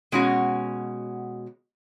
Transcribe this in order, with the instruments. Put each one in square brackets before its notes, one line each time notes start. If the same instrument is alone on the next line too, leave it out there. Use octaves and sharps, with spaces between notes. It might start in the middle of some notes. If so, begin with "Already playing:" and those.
[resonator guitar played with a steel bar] B2 G#3 C#4 F#4